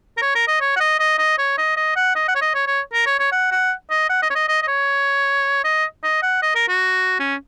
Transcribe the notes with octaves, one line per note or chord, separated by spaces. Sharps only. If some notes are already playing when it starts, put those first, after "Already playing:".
A#4
C#5
A#4
D#5
C#5
F#5
D#5
D#5
D#5
C#5
D#5
D#5
F#5
D#5
F#5
C#5
D#5
C#5
C#5
A#4
C#5
C#5
F#5
F#5
D#5
F#5
D#5
C#5
D#5
D#5
D#5
C#5
D#5
D#5
F#5
D#5
A#4
F#4
C#4